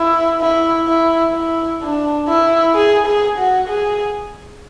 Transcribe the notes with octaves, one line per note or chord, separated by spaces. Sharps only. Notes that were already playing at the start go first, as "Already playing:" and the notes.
Already playing: E4
E4
E4
E4
D4
E4
G#4
G#4
F#4
G#4